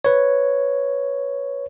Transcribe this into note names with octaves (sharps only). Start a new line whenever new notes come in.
B4 C#5